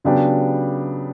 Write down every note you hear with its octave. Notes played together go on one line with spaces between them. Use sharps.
C#3 F#3 B3 D4 G4